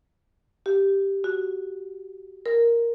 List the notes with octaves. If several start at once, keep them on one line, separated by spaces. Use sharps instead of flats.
G4
F#4
A#4